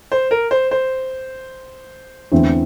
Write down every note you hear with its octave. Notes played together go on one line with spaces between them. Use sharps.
C5
A#4
C5
C5
E2 D3 A3 C4 E4